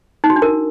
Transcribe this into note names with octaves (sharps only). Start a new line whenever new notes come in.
D#4
F#4
D4
A#4